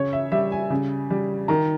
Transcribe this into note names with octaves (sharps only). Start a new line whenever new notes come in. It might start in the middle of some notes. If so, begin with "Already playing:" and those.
Already playing: C#3 C#5
E5
G3 E5
G#5
C#3
G3
D#3 A#5